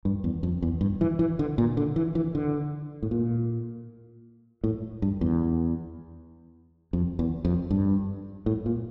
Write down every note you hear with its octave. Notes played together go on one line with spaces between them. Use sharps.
G2
E2
F2
E2
G2
E3
E3
D3
A#2
D3
E3
E3
D3
A2
A#2
A2
G2
E2
F2
E2
F2
G2
A2
A#2